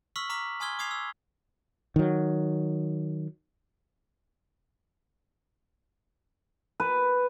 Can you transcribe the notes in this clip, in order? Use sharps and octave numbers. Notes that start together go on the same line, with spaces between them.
C#6 E6 F6 B6 F#7
A#5 C#6 D6 F6 B6
G#5 C6 D#6 F6 G#6 G7
D6 D#6 G#6 C7 F7
E6
D#3 F#3
B4